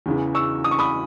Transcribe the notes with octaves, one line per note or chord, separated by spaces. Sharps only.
E2 C#3 E3
C#6 E6
D#6
C#6
B5 D#6